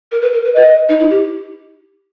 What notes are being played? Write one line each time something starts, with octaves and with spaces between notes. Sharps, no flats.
A#4
B4
A#4
B4
B4 D#5
D#4
E4
G4